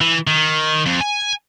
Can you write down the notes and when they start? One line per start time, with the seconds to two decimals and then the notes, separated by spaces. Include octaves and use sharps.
0.01 E3
0.27 D#3
0.86 F2
1.01 G#5